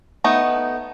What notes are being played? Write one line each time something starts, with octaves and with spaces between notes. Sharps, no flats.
A3 B3 D#4